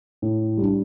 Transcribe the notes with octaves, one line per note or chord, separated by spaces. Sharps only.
A2
G3 D4